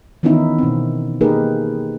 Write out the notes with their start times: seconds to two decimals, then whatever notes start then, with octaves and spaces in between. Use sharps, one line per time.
0.23 D#3 E3 B3 C#4 D#4 E4
0.58 B2 C4
1.21 A#3 D#4 G4 G#4 A#4 B4